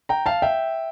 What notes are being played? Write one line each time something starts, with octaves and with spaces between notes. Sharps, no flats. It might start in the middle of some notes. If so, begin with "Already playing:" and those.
G5 A#5
F5 A5
E5 G5